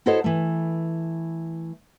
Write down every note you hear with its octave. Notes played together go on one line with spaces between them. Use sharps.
E4 F#4 A4 C5 C#5 D#5
E3 A3